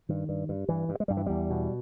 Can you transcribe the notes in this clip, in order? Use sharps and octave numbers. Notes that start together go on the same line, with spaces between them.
G2 D#3
G2
G2
G2 E3
G2
G#3
G2 G3
E3
E2 G3
B2